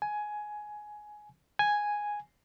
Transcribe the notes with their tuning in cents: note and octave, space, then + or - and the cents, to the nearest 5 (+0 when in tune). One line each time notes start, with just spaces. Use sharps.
G#5 +15
G#5 +0